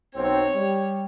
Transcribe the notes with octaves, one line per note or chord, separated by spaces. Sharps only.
B1 C4 C#5
G3